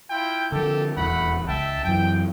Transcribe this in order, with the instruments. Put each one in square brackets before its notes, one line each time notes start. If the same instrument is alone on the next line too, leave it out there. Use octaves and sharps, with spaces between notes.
[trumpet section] E4 F4 G5
[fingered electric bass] D3 F3 [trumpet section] G4 A4
[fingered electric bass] D#1 E2 [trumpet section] A3 F#5 B5
[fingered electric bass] C#2 [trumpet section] E5 G5 A5
[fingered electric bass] F#2 E3 [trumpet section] G5